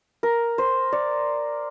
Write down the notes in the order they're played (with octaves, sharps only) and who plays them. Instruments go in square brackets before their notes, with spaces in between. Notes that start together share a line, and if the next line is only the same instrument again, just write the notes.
[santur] A#4
C5
D5